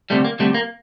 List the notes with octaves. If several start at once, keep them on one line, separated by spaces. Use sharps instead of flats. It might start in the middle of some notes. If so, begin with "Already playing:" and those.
D2 C3 G3 A3
A#3
D2 C3 G3 A3
A#3